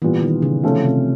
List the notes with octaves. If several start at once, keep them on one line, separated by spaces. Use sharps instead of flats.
A#2 E3 G3 B3
D#3
C#3
C3 F3 A3 C#4 F4
C3